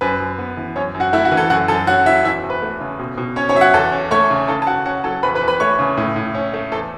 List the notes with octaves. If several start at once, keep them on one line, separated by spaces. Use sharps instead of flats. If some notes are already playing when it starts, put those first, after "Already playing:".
F#2 B4
F#2
B3
E3
F#2 C#4 C#5
F#2
F#4 F#5
A3 E4 E5
F#4 F#5
E3
A4 A5
F#2 F#4 F#5
F#2 A4 A5
C#4 F#4 F#5
F#3 E4 E5
E2 E4 E5
E2
B4
A3
C#3
B2
B2
C#4 C#5
C#4 C#5
F#3 E5
F#4 F#5
E2 A4 A5
C#4
A3 C#5 C#6
C#3
C#3 A4 A5
A5
C#3 F#4 F#5
C#4 F#4 F#5
F#3 A4 A5
E2 B4 B5
B4 B5
E2
B4 B5
A3 C#5 C#6
C#3
A2
A2
C#4
A3
E2 A4 A5